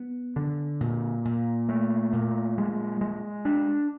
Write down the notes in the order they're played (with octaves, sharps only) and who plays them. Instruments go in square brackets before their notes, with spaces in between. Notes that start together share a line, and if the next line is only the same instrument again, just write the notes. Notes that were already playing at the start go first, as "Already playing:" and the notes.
Already playing: [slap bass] B3
D3
A#2
A#2
A3
A#2
G#3
G#3
D4